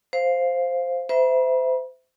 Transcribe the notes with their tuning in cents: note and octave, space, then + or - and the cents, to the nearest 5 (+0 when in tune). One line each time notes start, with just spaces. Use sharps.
C5 +0 F5 +0
C5 -30 E5 +0 B5 -40